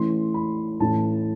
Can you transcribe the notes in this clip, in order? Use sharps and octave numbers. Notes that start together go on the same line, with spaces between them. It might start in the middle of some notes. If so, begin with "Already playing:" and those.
Already playing: A1 A2 E3 C6
B5
A1 A2 E3 A5